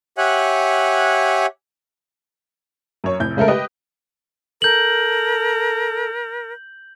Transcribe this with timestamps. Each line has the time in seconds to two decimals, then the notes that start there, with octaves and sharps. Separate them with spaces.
0.18 G4 C#5 E5 F#5 G#5 F#6
3.04 F#2 C#5
3.20 F1 A2 G6
3.37 C#3 G#3 A3 A4 A#4
3.48 G4 B4 D#5
4.62 A4 A#4 G6 F#7